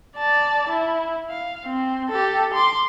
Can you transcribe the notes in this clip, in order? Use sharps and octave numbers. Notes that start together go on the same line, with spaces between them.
D5 A5
E4
F5
C4
G4 A4
C6 D6